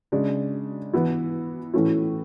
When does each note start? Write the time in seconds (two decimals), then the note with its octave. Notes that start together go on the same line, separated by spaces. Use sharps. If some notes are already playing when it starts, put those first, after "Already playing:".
0.12 C#3 G#3 D4
0.93 E3 B3 E4
1.74 A2 E3 A3 C#4 E4